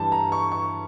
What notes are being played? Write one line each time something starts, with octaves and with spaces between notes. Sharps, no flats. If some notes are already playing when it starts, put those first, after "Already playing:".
Already playing: G2 E3 G3 A5
A#5
C#6
C#6